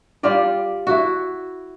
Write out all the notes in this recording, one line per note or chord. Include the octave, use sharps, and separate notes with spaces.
G3 F4 G4 D5
E4 F#4